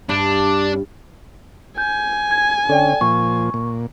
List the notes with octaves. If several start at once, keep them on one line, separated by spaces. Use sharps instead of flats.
G2 D4
G#5 G6
G#6
D3 C#4 A4 D5 G5
A#2 F3 C#6
A#2